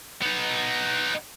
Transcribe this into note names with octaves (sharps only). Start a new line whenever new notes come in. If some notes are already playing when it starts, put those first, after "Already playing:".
B3 D#4